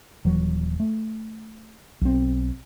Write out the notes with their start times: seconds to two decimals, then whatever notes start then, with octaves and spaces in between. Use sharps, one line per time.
0.25 D#1 E3 F#3
0.80 A3
2.01 B1 C4